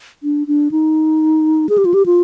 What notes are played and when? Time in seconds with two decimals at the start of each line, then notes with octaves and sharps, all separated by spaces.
0.23 D4
0.47 D4
0.71 D#4
1.69 G#4
1.78 G4
1.85 F4
1.94 G4
2.06 F4